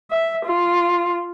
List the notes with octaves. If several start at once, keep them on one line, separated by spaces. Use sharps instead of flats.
E5
F4